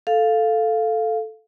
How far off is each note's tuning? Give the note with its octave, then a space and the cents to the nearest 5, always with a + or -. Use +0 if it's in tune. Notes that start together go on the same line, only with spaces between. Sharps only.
A4 +0 F5 +0